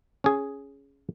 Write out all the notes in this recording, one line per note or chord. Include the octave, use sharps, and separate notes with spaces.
C#4 G#4